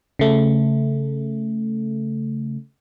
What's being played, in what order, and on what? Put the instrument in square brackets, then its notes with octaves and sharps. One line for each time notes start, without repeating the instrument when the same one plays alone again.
[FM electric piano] C#3 A3